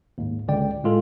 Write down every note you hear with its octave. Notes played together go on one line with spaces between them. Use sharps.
D#2 G#2
G#1 C#2 D3 D5 G5
A2 G#3 F4 A4